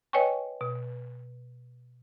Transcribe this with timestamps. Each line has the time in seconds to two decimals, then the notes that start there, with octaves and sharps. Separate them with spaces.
0.13 B4 C#5 D#5 G5 G#5 C#6
0.61 B2